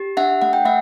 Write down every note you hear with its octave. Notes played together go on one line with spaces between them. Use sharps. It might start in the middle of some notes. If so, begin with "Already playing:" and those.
Already playing: G4
D4 E5 F#5
A3 F#5
G5
A3 E5 F#5